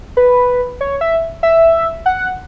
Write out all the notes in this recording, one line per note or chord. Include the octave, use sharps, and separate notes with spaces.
B4
C#5
E5
E5
F#5